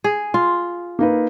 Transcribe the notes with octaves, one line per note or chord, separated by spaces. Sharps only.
G#4
F4
A#3 D#4 B4